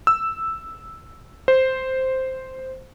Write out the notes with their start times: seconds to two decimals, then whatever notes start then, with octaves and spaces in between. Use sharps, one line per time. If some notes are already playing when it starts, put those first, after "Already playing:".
0.07 E6
1.48 C5